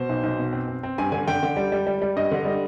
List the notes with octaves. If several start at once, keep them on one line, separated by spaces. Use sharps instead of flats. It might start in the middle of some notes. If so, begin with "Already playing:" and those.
Already playing: B2 C5
B1
B1
B2
C4
C4
C4
G2 G#5
D3 G#5
D3 G5
D3
G3
G3
G3
G3
G2 D#5
D3
G3